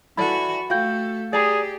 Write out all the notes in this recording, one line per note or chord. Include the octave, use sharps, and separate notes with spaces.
E3 E4 F#4 A4 D5 B5
A3 F#4 A4 F5 G5 G6
G4 G#4 D5 A#5